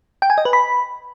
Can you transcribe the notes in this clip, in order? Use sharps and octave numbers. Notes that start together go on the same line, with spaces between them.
G5
G#5
D#5
B4
B5